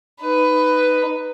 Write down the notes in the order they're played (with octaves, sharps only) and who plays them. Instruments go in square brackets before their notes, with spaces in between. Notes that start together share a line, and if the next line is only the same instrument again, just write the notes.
[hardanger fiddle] D#4 B4